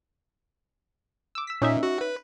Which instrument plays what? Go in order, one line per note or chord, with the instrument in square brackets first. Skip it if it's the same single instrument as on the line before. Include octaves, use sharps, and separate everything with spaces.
[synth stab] D6 E6
E6 B6
[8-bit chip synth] A#2 [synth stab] C#4 D#4 E5
[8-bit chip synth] F#4
B4